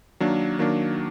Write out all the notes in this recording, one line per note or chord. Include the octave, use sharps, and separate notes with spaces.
D#3 F#3 A#3 D4
D#3 F#3 A#3 D4